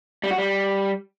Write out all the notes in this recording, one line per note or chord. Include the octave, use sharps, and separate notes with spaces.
G3
F#4
G3